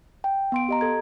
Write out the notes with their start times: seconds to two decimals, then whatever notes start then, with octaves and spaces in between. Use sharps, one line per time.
0.24 G5
0.52 B3 C6 D7
0.69 G4 D#5 A#5
0.81 A4 G#6